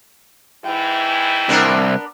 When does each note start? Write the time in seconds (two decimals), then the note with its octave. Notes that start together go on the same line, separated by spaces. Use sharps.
0.65 G#2 E3 E4 G5
1.49 C2 B3 D4 A#4